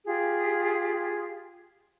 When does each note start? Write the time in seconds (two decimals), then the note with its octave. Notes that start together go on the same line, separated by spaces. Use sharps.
0.06 F4 G4 G#4